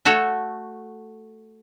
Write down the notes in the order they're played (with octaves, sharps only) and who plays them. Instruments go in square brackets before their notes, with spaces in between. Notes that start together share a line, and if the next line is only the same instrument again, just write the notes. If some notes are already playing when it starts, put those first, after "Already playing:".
[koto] A3 F#4 A4 C#5